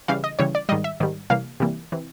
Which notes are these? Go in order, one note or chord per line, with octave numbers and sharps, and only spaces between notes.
C#3 E3 G3 F5
D#5
C#3 E3 G3 C#5
D5
G#2 D#3 G3 D#5
E5
G#2 D#3 G3
C3 E3 G3 A#3 F5
C3 E3 G3 A#3
C3 E3